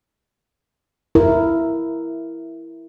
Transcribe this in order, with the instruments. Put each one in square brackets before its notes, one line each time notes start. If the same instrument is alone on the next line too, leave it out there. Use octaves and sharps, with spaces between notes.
[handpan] E4 A#4